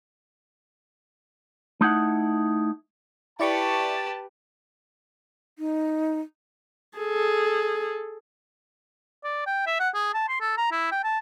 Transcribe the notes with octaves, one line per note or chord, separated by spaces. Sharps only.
A3 D#4 E4 F#5
E4 G4 B4 D5 A5 C#6
D#4
G#4 A4
D5
G5
E5
F#5
G#4
A5
C6
A4
A#5
E4
G5
A5